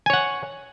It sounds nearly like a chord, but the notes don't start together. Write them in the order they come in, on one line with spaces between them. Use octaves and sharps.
G#5 C#5 F#5